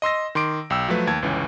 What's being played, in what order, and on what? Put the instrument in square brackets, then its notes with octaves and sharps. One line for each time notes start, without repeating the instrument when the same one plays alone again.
[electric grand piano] D#5 C6 E6 A#6
D#3 C6 D6 D7
B1 G5 E6
F3 F#3 A3 B4
D#2 A5 G#6
G1 C#2 E3 C#4